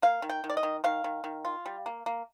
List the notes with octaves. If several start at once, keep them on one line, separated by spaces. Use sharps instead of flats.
A#3 F5
D#3
G5
D#3
D5
D#5
D#3
D#3 F5
D#3
D#3
F4
G3
A#3
A#3